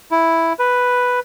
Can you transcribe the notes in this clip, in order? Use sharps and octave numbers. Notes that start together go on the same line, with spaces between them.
E4
B4